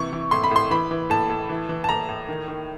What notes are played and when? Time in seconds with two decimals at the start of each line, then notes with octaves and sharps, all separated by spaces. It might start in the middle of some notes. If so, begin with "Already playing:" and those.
Already playing: C3 E3 C#6
0.13 E3
0.31 A2 C6
0.44 B5
0.51 A2 C6
0.71 E3 B5
0.91 E3
1.10 A2 A5
1.30 A2
1.49 E3
1.69 E3
1.84 A5
1.89 A2 A#5
2.09 A2
2.28 D#3
2.48 D#3